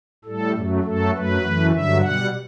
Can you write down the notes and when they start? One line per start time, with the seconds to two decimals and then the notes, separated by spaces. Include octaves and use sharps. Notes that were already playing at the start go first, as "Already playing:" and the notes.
0.25 A2 G3 A4
0.54 F#2 F#3 A3
0.83 F#2 F#3 A3 A4
1.13 F#2 F#3 A3 B4
1.42 F#2 E3 A3
1.71 G2 D3 F#3 E5
2.00 B2 G3 F#5